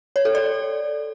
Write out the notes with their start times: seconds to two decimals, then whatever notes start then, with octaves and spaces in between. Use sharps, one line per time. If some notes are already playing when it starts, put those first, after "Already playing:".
0.16 C#5
0.25 A4
0.35 D5